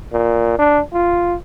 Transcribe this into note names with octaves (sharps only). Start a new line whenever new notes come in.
A#2
D4
F4